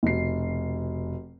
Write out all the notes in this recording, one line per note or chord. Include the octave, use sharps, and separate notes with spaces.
F1 B2 C7